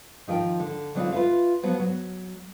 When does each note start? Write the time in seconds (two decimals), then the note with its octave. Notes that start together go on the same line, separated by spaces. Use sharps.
0.28 D#3 F3 A#4 G5
0.60 D3
0.95 D3 F#3 C4 D#4 F4 B4
1.12 F4 B4 C5 E5 F5
1.63 F3 F#3 B3
1.80 F#3